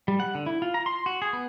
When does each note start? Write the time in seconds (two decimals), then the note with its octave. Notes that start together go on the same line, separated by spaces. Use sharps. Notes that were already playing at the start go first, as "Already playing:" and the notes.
0.08 G3
0.20 F#5
0.35 D3
0.46 E4
0.62 F4
0.74 A#5
0.86 C6
1.06 F#4
1.22 G#4
1.33 B3